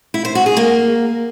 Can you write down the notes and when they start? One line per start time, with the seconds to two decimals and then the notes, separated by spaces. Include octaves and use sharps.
0.14 E4
0.25 C5
0.35 F#4
0.46 G#4
0.57 A#3